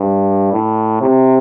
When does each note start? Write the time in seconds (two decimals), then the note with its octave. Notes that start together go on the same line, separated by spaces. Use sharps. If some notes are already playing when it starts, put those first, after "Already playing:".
Already playing: G2
0.52 A2
1.01 C3